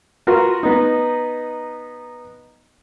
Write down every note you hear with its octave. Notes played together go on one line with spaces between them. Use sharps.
F4 F#4 A#4 B4 C6
B3 D#4